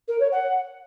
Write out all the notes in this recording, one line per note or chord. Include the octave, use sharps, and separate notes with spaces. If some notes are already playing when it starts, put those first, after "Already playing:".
A#4
C#5
F#5